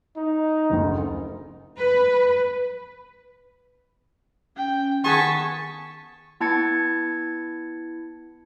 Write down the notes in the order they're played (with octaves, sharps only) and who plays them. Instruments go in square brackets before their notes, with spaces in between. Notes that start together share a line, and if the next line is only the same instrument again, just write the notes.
[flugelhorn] D#4
[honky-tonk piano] F#1 D2
[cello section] B4
[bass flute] C#4 [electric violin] G5
[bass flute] D#3 [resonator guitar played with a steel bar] B3 G#4 G#5 [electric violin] A5 B6 [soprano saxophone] C#6
[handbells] B3 E4 A5 G#6 A6 C#7